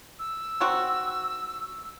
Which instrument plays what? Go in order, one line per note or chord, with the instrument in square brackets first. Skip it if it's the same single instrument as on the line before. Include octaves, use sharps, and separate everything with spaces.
[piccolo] E6
[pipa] D#3 C4 F#4